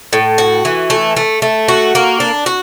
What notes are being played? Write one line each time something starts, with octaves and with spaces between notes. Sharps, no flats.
A2
F#4
E3
A3
A3
A3
F#4
A#3
D4
F#4